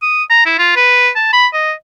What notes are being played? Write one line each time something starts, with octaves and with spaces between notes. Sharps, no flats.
D#6
A#5
E4
F4
B4
A5
B5
D#5